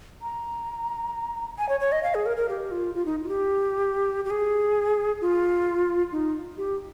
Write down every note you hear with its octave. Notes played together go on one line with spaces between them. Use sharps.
A#5
G#5
C#5
C#5
D#5
F5
G#4
A#4
A#4
G4
F4
F4
D#4
F4
G4
G4
G#4
F4
D#4
G4